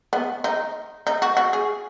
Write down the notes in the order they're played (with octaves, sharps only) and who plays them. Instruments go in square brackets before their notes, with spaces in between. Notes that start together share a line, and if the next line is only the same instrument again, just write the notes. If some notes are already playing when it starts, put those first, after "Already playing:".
[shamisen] B3
D#4
D#4
F#4
F#4
G#4